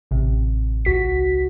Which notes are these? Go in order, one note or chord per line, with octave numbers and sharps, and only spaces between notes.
A1 C3
C#2 F#4 B6